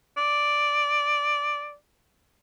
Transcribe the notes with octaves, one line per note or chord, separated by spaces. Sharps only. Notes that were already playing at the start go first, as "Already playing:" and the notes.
D5